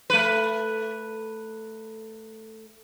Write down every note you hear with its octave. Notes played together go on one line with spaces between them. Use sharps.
A3 B4